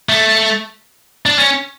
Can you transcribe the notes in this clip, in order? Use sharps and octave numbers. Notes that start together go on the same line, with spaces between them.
A3
D4
C#4